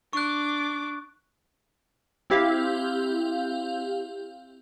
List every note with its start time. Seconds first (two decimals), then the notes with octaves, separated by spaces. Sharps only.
0.13 D4 C#6 D6 F#6
2.30 C4 E4 G4 F5